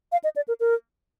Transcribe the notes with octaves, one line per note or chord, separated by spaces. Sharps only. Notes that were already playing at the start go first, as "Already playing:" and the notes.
F5
D#5
D5
A#4
A#4